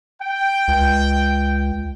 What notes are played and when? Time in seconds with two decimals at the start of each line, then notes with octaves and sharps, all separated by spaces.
0.22 G5
0.68 C#2